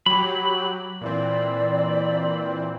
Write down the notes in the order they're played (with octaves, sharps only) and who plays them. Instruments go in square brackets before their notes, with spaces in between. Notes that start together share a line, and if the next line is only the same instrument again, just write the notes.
[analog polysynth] F#3 G4 [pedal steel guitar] B5
[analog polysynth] A#2 E3 C4 [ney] D5